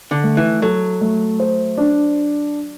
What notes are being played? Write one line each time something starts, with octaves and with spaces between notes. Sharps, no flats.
D3
A3
E3
F#3 A4
A3
C5
D4